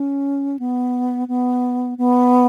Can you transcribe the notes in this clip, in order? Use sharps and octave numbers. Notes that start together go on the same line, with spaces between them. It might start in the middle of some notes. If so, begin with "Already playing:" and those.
Already playing: C#4
B3
B3
B3